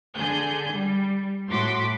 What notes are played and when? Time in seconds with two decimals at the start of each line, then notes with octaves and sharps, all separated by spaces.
0.15 D3 G#4 G6
0.72 G3
1.50 A2 F#4 C6 D6 B6